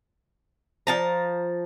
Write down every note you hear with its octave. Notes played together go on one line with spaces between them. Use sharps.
F3 A5 A#5